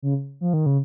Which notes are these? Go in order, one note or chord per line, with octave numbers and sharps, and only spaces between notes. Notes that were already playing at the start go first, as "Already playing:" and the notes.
C#3
F3
D#3
C#3